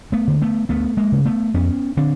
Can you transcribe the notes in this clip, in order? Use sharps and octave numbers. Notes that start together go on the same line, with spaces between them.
A3 B3
D3
A3 B3
D2 A3 B3
G#3 A#3
C#3
A3 B3
F2 B3 C#4
D3 C4 D4